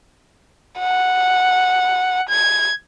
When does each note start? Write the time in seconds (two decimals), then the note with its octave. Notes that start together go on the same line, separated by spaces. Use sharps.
0.79 F#5
2.29 G#6